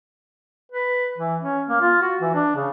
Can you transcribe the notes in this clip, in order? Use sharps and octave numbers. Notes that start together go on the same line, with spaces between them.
B4
E3
C#4
A#3
F4
F#4
E3
D4
C#3